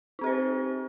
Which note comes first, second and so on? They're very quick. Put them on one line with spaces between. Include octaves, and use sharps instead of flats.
D#4 C4 G4 C5 B4